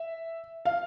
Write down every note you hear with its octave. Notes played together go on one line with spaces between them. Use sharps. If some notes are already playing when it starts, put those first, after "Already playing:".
Already playing: E5
F5